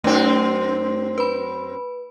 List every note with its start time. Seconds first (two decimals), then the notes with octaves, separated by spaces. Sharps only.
0.04 F#2 A3 C4 D#4
1.18 B4 B5